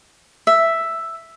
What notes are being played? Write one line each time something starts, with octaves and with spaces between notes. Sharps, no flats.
E5